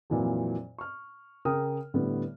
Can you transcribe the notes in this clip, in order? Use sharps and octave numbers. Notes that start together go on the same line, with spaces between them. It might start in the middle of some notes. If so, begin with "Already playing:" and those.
F2 A#2 E3 F#3
C#6 F6
C#3 A#4 G5 D#6 F6
A2 D3 G3 B3